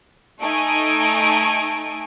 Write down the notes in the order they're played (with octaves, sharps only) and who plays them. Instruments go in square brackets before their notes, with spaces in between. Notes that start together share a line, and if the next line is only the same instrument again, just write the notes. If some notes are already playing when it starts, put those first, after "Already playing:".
[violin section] A3 D#4 G#5 D7